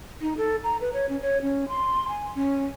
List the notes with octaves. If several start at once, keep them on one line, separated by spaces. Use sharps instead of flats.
D#4
A4
A#5
B4
C#5
C#4
C#5
C#4
C6
G#5
C#4